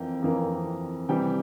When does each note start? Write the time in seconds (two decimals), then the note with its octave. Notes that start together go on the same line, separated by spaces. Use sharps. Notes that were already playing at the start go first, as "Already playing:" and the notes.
Already playing: F2 E3 A#3 G5
0.22 F2 E3 A#3
1.09 C3 E3 G3 G5